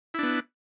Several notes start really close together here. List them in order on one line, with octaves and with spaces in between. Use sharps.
E4 D4 B3